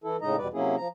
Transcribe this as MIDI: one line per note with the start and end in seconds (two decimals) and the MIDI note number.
0.04 0.17 52
0.04 0.17 64
0.04 0.17 69
0.21 0.36 45
0.21 0.36 49
0.21 0.36 56
0.21 0.36 63
0.21 0.36 75
0.21 0.36 82
0.38 0.48 40
0.38 0.48 47
0.38 0.48 55
0.38 0.48 71
0.38 0.48 74
0.53 0.76 48
0.53 0.76 54
0.53 0.76 58
0.53 0.76 61
0.53 0.76 64
0.53 0.76 68
0.77 0.88 53
0.77 0.88 82